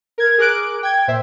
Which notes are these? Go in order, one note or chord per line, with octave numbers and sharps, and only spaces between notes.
A#4 G#6
G#4 A#4 D6 F#6 D7
G5 G#6
A#2 C5 E5